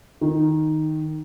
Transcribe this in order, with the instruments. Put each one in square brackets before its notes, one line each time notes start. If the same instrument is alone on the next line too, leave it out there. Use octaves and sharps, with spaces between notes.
[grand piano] D#3